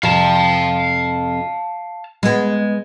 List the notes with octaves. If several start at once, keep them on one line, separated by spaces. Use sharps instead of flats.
F2 C3 F5 A5
G#3 B3